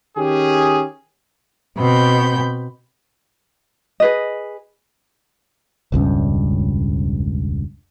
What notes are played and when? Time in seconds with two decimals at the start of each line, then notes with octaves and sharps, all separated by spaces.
0.17 D#3 C#4 G4 G#4
1.78 B2 C4 B5 G6
4.00 G#4 B4 D#5
5.92 E1 C#2 G2 C#4